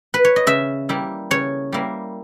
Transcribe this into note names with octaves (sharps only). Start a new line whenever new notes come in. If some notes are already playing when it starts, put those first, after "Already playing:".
B4
C#5
D#5
C#3 E5
G3 A#3 E4
C#3 C#5
G3 A#3 E4